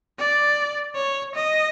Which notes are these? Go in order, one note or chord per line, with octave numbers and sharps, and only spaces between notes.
D5
C#5
D#5